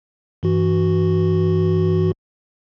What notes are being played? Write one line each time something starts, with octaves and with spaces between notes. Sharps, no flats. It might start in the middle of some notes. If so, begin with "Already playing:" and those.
G2 E3 F#4